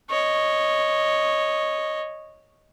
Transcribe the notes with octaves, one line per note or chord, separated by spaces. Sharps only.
C#5 D#5